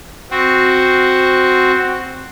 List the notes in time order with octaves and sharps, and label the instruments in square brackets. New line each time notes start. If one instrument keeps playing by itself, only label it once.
[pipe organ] C4 F#4